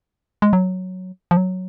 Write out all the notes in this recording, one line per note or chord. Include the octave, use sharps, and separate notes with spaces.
G#3
F#3
F3
F#3